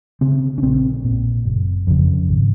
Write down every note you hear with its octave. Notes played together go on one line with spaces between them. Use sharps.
C#3 C4
C#4
A#1 C4
A#2
F#1
F2 C#3
G#1